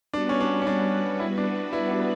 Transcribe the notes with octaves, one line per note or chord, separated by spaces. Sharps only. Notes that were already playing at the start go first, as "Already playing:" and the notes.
G3 B3 D4 F#4 B4
C#4
D4
C#4
D4
E4
D4
E4
D4
B3